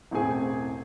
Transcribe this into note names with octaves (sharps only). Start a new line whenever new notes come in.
E1 A1 A3 C4 G#4 G#5